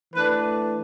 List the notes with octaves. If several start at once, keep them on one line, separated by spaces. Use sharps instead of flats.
E3 A3 D4 B4